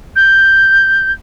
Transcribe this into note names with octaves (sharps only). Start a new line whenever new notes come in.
G6